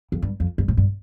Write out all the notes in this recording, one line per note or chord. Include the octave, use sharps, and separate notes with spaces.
F2
G2
F2
G2
A2
G2